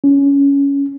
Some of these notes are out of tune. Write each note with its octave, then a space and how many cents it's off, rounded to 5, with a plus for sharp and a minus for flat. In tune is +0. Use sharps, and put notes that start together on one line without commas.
C#4 +15